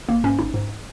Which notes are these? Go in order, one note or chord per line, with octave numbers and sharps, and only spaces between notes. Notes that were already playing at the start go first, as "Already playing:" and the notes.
G#1 A#3
G#2 C#4
G#1 D#4
G#2